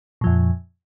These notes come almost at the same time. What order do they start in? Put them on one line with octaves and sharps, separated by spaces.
A#2 F3 F2